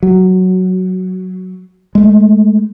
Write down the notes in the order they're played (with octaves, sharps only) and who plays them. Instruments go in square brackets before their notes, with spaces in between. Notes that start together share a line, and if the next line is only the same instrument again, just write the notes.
[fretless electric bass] F#3
G#3 A3